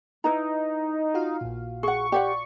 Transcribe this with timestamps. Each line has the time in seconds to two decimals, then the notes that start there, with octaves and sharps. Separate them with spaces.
0.24 D#4 E4 B4 A#5
1.14 F4 F#4 F5
1.41 A#1 A#2
1.83 G#4 F#5 C#6
2.12 G4 C5 D5 F#5